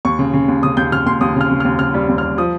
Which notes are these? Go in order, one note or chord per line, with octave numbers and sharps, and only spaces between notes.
D#2 C#6
C#3
C#3
D#2
C#3 D#6
D#2 G6
C#3 F6
D#2 C6
D#2 D#6
C#3 F6
C#3
F6
D#2
C#3 F6
G3
D#2
F6
G3
F3 D#6